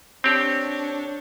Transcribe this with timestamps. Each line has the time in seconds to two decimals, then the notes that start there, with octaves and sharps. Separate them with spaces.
0.24 C4 D4 G4 C#5